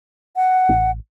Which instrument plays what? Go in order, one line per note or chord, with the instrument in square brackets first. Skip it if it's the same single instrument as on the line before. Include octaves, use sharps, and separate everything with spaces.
[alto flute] F#5
[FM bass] A1